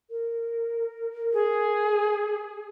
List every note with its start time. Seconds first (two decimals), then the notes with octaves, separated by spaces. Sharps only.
0.10 A#4
1.33 G#4